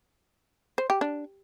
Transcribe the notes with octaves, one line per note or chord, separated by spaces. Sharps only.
C5
G4
D4